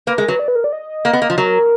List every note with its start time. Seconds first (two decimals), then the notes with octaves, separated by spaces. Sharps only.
0.07 A#3 B4
0.17 G#3 A#4
0.28 F#3 B4
0.39 D5
0.48 B4
0.55 A#4
0.64 D5
0.73 D#5
1.05 A#3
1.13 B3
1.22 A#3
1.30 F3
1.38 F#3 A#4